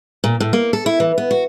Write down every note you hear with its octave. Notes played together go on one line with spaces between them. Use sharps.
A#2
A2
A#3
A4
E4
E3
B3
F#4